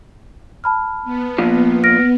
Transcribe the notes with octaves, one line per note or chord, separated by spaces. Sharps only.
A5 B5 F6
B3
A#2 F3
F6 A#6 D7